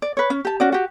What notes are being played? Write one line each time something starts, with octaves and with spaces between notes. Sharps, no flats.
D5
B4 C#5
C#4
G4 A5
C#4 F#4 D5
F#4 G4